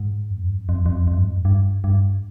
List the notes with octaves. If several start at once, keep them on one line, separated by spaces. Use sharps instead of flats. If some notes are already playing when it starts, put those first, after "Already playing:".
Already playing: G#2
F2
G2
F2
F2
F2
F2
G2
F2
G#2
G2
G2